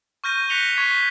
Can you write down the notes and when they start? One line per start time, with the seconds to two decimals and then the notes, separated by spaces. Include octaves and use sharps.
0.24 C#6 F6 G6 A#6 D#7
0.49 F#6 A#6 B6 C#7 F7 G7
0.76 C#6 G#6 B6 C7